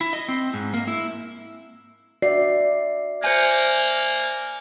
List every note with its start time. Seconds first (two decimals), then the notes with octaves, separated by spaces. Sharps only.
0.01 E4
0.13 D#5
0.28 C4
0.54 G#2
0.74 A#3
0.88 E4
2.22 F#4 D5 E5 C7
3.24 A#3 C5 E5 G#5 G6 C#7